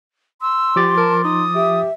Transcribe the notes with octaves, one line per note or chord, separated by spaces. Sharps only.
C6 E6
F3 G4 D6 A6
A#4 A5
D#4 D#6
G4 E5